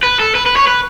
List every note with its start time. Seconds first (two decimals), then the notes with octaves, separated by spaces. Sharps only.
0.04 B4
0.20 A4
0.35 B4
0.46 B4
0.56 C#5
0.67 B4